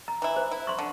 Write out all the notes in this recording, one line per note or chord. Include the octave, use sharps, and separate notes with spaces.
A#5
E3 E4
C5
E4
C6 C#6
D3